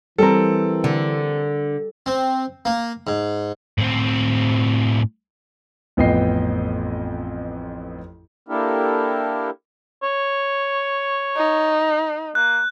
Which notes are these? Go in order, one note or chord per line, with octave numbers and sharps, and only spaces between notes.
E3 G3 C4 A4 A#4
D3
C4
A#3
G#2
A2 C4
A1 F2 B3 D#5 G5 C7
A#3 D4 E4 G4 A4 A#4
C#5
D#4
A#3 F#6